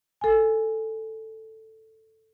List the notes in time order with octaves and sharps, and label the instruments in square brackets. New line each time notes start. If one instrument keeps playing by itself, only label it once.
[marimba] A4 G#5